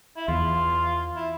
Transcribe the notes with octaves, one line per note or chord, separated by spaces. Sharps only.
E4
E2 F4
E4